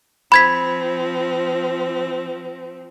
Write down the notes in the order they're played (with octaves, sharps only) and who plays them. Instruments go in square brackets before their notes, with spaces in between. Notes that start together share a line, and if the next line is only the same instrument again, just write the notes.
[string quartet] F3 C4 [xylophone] B5 G#6 B6